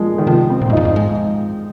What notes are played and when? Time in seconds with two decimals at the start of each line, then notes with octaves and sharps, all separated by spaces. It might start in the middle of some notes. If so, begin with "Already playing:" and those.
Already playing: F3 G#3 A#3
0.18 D#3
0.27 C3 F3
0.50 C4
0.61 A#2
0.68 G#2 F4
0.73 F2 D#4
0.85 G#2
0.96 G#3